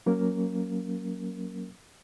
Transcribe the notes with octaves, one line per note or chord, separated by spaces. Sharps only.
F#3 A#3 C#4 A#4